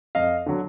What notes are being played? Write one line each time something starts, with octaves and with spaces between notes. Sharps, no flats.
F2 D#5 F5
D3 F#3